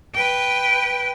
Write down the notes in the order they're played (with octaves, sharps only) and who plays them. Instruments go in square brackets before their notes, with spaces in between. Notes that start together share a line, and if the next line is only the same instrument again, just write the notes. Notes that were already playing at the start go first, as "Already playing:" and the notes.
[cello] B4 G5